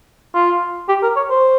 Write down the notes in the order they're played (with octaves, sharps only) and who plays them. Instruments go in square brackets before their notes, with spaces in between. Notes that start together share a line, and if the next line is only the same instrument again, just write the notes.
[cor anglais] F4
G4
A#4
C#5
C5